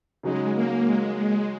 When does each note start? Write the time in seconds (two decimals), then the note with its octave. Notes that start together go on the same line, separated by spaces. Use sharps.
0.23 C#3 F#3 G#3 D#4
0.54 A#3
0.85 G#3
1.15 G#3